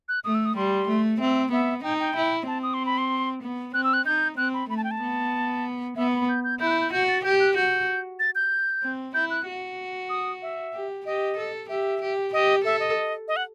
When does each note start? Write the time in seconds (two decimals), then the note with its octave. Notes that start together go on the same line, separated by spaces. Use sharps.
0.09 F#6
0.24 A3 D#6
0.35 E6
0.45 D#6
0.56 G3 C6
0.88 A3
1.20 C4 E5
1.51 B3 E5
1.83 D#4 G5
2.00 G5
2.16 E4
2.47 C4 A5
2.63 D#6
2.74 C6
2.86 B5
2.98 C6
3.42 B3
3.74 C4 F#6
3.84 E6
3.94 F#6
4.06 D#4 G6
4.37 C4 F#6
4.54 B5
4.69 A3 B5
4.77 A5
4.84 G5
4.91 A5
5.01 B3
5.96 B3 E5
6.13 B5
6.29 G6
6.44 G6
6.60 E4 G6
6.67 F#6
6.71 G6
6.81 G6
6.92 F#4 G6
7.08 A6
7.24 G4 G6
7.40 F#6
7.55 F#4 G6
8.19 A6
8.35 G6
8.83 C4
9.14 E4 G6
9.30 F#6
9.46 F#4
10.10 D#6
10.42 E5
10.74 G4
11.06 G4 D#5
11.37 A4
11.69 G4 E5
12.01 G4
12.33 G4 D#5
12.64 A4 E5
12.80 D#5
13.28 D#5
13.36 F#5